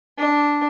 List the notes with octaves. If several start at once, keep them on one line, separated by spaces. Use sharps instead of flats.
D4